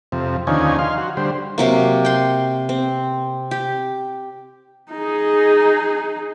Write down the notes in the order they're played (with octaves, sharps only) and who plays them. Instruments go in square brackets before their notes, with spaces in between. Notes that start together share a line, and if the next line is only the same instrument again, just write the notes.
[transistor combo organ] F2 C3
D#2 D3 F3 C#4 D#4 G#5
F5 C6
F#4
D3 G3 C5
[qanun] C3 F#3 A#3
G5 C6
C4
G4
[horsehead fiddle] D#4 G#4